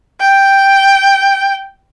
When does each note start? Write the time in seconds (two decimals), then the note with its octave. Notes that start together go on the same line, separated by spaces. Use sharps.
0.20 G5